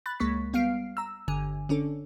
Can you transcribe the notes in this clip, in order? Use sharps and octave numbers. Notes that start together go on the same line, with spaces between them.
B5 F#6 A6
C#2 G#3 A#3 C#6 B6
G3 B3 F5 F6 C7 D7
A#5 E6
G1 D3 G#5
D3 C#4 D4 A4